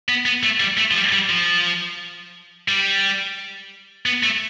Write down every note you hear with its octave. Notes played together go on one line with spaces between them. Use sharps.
B3
B3
A3
G3
A3
F3
G3
G3
F3
G3
B3
A3